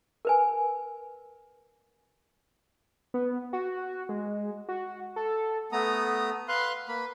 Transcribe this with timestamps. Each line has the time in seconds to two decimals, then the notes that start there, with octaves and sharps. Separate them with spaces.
0.25 A#4 B4 G#5
3.14 B3
3.53 F#4
4.09 G#3
4.69 F#4
5.16 A4
5.72 A3 B3 A#5 D#6
6.48 B4 F5 C6 F#6
6.88 A#3 B4 B5